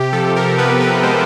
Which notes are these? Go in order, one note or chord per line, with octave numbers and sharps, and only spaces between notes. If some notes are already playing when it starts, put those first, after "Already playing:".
Already playing: C3 G4
F3 A4
A#4
B3 B4
B4
G#3 C5